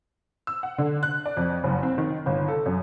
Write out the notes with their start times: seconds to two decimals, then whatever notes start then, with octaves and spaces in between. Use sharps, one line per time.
0.47 E6
0.63 F#5
0.78 D3
1.03 F#6
1.26 D5
1.37 F2
1.64 F#1
1.83 C4
1.98 D#3
2.26 G1
2.48 A4
2.66 F#2